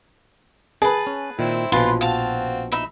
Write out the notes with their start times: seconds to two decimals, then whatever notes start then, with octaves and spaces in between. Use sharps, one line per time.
0.82 G#4 B4 A5
1.07 C#4
1.39 A#2 D#3 C4 E4
1.72 A#1 B2 E3 F3 F4 B4 C6
2.01 C4 F#4 F5 A5
2.72 D#4 E5 B5